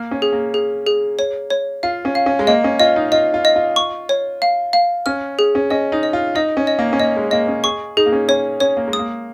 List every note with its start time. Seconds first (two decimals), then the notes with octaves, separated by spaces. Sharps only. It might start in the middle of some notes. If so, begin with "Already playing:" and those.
Already playing: A#3 F6
0.11 C#4
0.22 G#4
0.33 A#3
0.54 G#4
0.87 G#4
1.19 C#5
1.50 C#5
1.83 F4 F5
2.05 C#4
2.15 F5
2.26 C#4
2.39 G#3
2.47 A#3 D#5
2.64 C#4
2.79 F4 D#5
2.96 D#4
3.12 F4 D#5
3.34 F4
3.45 D#5
3.56 F4
3.76 C#6
4.09 C#5
4.42 F5
4.73 F5
5.06 C#4 F6
5.39 G#4
5.55 C#4
5.70 C#4 D#5
5.92 D#4
6.03 D#5
6.13 F4
6.35 D#4 D#5
6.57 C#4
6.67 D#5
6.79 A#3
6.93 C#4
7.00 A#3 D#5
7.16 G#3
7.31 A#3 D#5
7.48 C#4
7.64 G#4 C#6
7.97 D#4 G#4
8.06 A#3
8.13 C#4
8.28 C#4 C#5
8.60 C#4 C#5
8.77 A#3
8.88 G#3
8.93 D#6
8.99 A#3